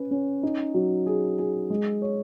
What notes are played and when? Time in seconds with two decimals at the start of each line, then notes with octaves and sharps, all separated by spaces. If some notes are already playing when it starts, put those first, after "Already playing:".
Already playing: C#4 B4
0.11 C#4
0.43 D#4
0.74 F#3
1.07 G#4
1.39 G#4
1.70 G#3
2.02 C#5